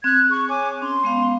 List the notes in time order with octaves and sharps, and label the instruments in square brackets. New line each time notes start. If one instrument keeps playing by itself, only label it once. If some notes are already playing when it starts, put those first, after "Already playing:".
[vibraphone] C4 [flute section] F#6 G#6
[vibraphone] G#4 [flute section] C#6
[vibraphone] C#5 [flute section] G#5 D6
[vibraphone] C#4 [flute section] C6
[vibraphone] G#3 B3 F5